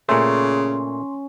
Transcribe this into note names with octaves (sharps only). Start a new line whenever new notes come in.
A#2 C#3 A3 C#4 C6